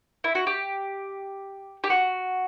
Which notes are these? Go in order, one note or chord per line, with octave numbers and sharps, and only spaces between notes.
E4
F#4
G4
G4
F#4